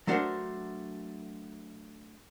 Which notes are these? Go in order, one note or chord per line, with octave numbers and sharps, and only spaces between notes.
F#3 A3 D4 F#4 A#4 C5